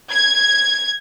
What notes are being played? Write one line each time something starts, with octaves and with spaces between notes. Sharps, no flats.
G#6